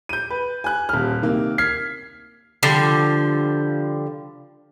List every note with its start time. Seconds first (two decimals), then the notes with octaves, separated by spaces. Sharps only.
0.09 G6 D#7
0.30 B4
0.64 G#5 F#6
0.89 D#1 F6
1.22 C3 D#3 A#3
1.58 F6 G#6 B6 C7
2.63 D3 F3 G3